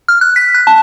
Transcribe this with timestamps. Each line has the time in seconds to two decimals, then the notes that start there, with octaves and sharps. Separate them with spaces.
0.08 F6
0.21 F#6
0.36 B6
0.54 F#6
0.67 A5